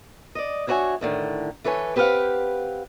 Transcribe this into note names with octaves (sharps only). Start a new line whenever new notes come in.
D5 D#5
D4 E4 F#4 C#5 E5 G#5
A2 D3 D#3
E3 A4 B4 C#5 G#5
C4 G4 B4 C#5 F5 F#5